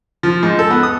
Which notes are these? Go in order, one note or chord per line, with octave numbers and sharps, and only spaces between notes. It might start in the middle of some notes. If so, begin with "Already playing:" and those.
F3
G#2
A4
B3
D#6